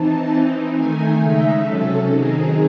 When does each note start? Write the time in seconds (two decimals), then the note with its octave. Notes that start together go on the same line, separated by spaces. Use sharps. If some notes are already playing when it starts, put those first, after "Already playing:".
Already playing: E3 C4 D#4 A5
0.29 E3 C4 D#4
0.74 D#3 A3 D#4 G#5
1.18 C#3 G#3 D#4 E5
1.63 C3 F#3 C#4 A4
2.08 D#3 F#3 C4 D#4 G#4